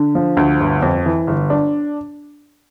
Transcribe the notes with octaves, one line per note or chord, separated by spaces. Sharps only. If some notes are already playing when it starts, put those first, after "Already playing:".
Already playing: D3
F3
D2
G1
F2
E3
G1
D4